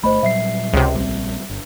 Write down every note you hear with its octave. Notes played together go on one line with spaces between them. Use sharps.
G1 E2 A3 C5 D#5 B5
A#2 F#3 G3 E5 C7
C#2 C3
A#1 G3 C4
G1